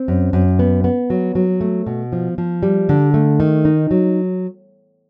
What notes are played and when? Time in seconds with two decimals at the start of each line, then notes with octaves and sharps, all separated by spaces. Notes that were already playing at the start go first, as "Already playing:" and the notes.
Already playing: C4
0.08 F#2
0.33 F#2
0.59 B3
0.84 B3
1.10 F#3
1.35 F#3
1.61 A3
1.86 B2
2.13 F3
2.38 F3
2.63 G3
2.89 D3
3.14 A3
3.40 D#3
3.65 D#4
3.91 F#3